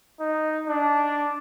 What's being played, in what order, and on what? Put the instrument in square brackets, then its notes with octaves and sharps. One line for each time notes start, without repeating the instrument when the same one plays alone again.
[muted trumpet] D#4
D4